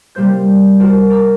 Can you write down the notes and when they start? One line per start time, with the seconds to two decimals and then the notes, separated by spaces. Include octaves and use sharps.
0.15 C3 G3 A#3 C5 G6
0.80 F#4 A#4 C5 D5
1.10 D5 A#5 D6 E6